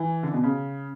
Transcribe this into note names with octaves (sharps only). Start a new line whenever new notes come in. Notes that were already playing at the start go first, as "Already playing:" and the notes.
Already playing: E3
D3
B2
C#3